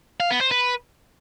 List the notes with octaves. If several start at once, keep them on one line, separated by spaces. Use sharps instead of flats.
F5
B3
C5
B4